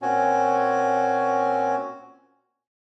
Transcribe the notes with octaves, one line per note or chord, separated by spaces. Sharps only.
A#2 C4 C#4 F#4 G#5